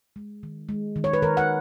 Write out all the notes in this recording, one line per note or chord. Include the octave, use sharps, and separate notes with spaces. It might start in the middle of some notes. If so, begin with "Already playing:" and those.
G#3
D#3
G#3
D#3
C#5
B4
D#3 A#4
F#5